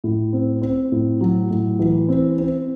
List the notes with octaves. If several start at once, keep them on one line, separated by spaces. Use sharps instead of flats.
A2
C4
C4
A2
F#3
A2
E3
C4
C4